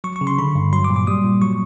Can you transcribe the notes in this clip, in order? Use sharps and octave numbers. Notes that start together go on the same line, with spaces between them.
F#3 C#6
C#6
C#3
C6
D3 B5
G2
F#3 C6
D6
A#2
D6
G3 D#6
A#2
F#3 C#6